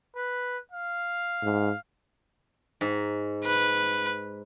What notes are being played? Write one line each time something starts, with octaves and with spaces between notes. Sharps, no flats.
B4
F5
G#2
G#2
B4